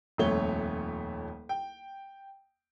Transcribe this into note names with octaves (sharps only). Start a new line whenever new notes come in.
D#1 F2 A3 C#5 G7
G5